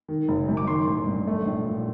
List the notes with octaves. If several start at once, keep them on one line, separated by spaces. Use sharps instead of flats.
D#3
F#1
F#2
D6
D#3 C6
A1
G2
A3
A#1
A#2